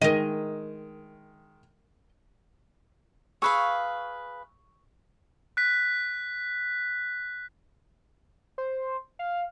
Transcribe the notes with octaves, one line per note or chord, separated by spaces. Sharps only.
D#3 G#3 A#4 D#5
G#4 B4 F5 C#6 E6
F#6 B6
C5
F5